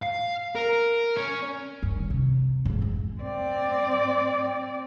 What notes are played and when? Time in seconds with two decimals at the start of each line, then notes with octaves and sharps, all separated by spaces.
0.03 F5
0.55 A#4
1.17 C#4
1.83 G2 E3
1.97 D#3
2.10 C3
2.65 F2 G#2
2.82 G#3
3.21 C4 D5